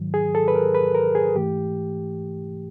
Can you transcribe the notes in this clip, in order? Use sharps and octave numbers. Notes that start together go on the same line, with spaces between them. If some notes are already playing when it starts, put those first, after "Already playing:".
Already playing: G#2 D#3 F#3
G#4
A4
B4
A#4
B4
A#4
G#4
G#2 E3 A3 G4